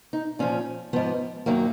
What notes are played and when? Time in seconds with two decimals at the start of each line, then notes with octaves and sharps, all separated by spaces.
0.13 D#4
0.39 A#2 F3 C#4
0.93 G#2 F3 B3
1.46 F#2 D#3 F#3 A#3